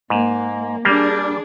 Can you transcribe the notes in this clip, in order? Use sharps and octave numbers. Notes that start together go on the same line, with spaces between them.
G#2 A#3
G3 A#3 D4 G#4